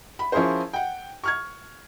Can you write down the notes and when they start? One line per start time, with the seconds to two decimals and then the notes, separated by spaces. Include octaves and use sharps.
0.19 B5
0.32 F3 C#4 E4 G#4 A#4 C5
0.73 F#5 G5
1.24 C#6 F6 G#6